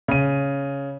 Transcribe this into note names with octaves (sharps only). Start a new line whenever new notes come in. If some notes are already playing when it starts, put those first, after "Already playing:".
C#3 D#7